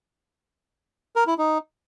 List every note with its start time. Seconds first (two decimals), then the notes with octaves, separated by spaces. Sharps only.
1.16 A#4
1.27 E4
1.38 D#4